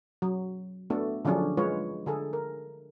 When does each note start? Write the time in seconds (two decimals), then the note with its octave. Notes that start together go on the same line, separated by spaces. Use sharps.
0.22 F#3
0.90 A3 B3 D4 F#4 A4
1.25 D3 F3 F#3 C#4 D4 G#4
1.57 G#3 F4 B4 C#5
2.06 D3 G#4 A4
2.33 A#4